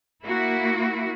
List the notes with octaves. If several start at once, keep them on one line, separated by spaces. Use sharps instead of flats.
A#3 E4 F#4